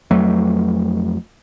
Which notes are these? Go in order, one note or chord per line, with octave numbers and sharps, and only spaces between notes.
F2 F#3 A3